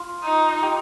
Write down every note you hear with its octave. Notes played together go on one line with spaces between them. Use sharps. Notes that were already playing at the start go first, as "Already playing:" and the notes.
Already playing: F4
D#4
G4